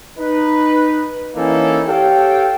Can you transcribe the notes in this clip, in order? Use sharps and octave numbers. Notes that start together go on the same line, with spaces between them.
D#4 B4
E3 A#3 C#4 D#4 E4 A4
G4 A4 C#5 F5 G5